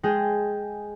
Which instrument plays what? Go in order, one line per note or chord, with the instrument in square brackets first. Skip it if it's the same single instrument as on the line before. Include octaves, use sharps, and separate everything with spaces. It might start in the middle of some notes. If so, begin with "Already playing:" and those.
[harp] G#3 G#4 G5